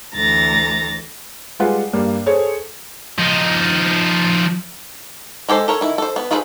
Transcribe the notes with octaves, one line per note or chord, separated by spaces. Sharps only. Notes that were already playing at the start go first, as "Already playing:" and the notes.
D2 E3 A3 A#5 A6 A#6
G3 G#3 F4 B4 F#5
G2 G3 A#3
G#4 A4 C5 C#5
F3 D#4
G#3 G4 A4 C5
A4 A#4 C#5
D#3 E4
A4 C5
B3
F4 G#4 A4 B4 C5